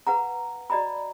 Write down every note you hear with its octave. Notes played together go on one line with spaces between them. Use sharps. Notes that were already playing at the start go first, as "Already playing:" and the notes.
B4 F5 F#5 A#5
F#4 D5 D#5 A#5 B5